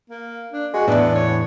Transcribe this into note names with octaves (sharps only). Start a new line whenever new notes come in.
A#3
D4
G#3 F#4
E2 A2 B3 D4
C#5